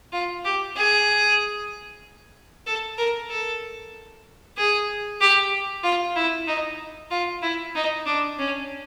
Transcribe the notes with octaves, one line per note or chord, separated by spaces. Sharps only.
F4
G4
G#4
A4
A#4
A4
G#4
G4
F4
E4
D#4
F4
E4
D#4
D4
C#4